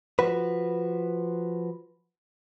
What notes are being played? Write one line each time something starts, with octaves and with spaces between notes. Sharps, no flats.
F3 F#4 B4